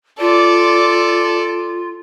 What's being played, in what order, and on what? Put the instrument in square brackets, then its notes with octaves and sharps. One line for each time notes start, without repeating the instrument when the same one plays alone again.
[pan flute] F4 [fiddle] A4 D5